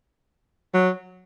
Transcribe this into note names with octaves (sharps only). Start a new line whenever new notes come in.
F#3